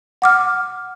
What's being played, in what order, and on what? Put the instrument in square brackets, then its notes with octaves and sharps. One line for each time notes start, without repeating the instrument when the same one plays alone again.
[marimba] F#5 D6 F6